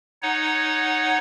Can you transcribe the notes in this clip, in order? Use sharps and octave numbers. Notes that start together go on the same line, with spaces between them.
D#4 C#5 F#5